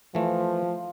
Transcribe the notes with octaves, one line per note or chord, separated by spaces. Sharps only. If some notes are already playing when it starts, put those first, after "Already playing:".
E3 F3 A3